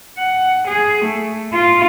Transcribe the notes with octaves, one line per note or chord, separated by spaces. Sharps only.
F#5
G#4
A3
F4